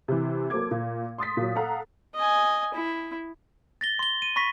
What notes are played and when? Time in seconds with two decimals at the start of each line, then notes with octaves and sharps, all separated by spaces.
0.08 C3 E3
0.50 F#3 A#3 A4 C5 D6 G#6
0.71 A#2
1.18 C6 D#6 A6 B6
1.37 A#2 F#3
1.55 A4 F5 F#5 A#5
2.15 D#5 G#5
2.74 E4
3.81 A6 A#6 G7
3.99 C6 G7
4.22 D#7
4.36 B5 C#6 A#6 B6